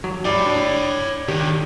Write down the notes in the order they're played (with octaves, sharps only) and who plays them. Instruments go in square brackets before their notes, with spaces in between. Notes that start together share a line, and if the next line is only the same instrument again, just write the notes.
[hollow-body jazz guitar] F#3
[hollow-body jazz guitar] G#2 G3 [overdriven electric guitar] C#5 G5 [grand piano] D5 B5
[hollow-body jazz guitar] D4
[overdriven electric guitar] D3 D#3 [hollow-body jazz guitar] G4 G5